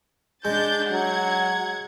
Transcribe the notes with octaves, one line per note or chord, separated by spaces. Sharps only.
G#3 D4 G6 A6
F#3 F#5 G#6